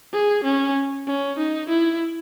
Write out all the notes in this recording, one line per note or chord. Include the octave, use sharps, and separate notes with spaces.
G#4
C#4
C#4
D#4
E4